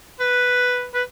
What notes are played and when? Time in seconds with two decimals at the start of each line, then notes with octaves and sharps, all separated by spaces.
0.20 B4
0.94 B4